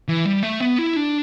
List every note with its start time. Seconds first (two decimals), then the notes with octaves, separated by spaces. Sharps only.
0.08 E3
0.26 G3
0.43 A3
0.60 B3
0.78 E4
0.96 D4